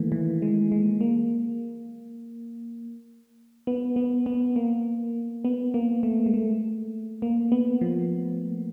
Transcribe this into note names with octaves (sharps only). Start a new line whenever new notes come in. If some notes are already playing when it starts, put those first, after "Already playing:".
Already playing: D#3 E3 A3 A#3
E3
G#3
G#3
A#3
B3
B3
B3
A#3
B3
A#3
A3
G#3
A3
A#3
B3
F3